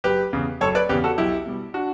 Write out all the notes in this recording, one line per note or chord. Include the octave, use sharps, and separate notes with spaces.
F#1 G4 B4
E2 C#3
F#1 A4 C#5
B4 D5
E2 C#3 G4 B4
F#4 A4
B1 E4 G4
B2 G3
D4 F#4